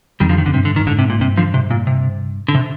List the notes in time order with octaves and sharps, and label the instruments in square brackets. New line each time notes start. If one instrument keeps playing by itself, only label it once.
[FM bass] F2 [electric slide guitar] D#3 G3
[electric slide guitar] D3 F3
D#3
[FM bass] F2 [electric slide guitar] D3
[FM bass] G2 [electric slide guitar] C3
[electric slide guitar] D3
D#3
[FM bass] G2
[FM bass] G#2 [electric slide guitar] D3
[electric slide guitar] C3
A#2
[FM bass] G2 [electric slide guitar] C3
[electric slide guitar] D3 F3
C3
A#2
C3
D3
C3